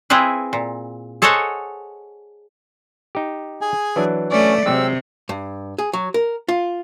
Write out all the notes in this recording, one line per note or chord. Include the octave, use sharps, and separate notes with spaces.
C4 E4 F4 G#4 B4
A#2
G#4 A4 C5 C#5 D#5 F#5
D#4 G4
G#4 G#5
E3 F#3 D4
A3 C#4 D5
C3 F#3 G#3 C4 E6
G2
G#4
F#3
A#4
F4